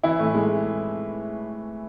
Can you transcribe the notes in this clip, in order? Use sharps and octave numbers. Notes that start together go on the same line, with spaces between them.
E3 E4
A2 A3
G#3